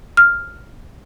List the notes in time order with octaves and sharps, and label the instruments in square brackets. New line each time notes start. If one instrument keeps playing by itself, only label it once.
[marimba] F6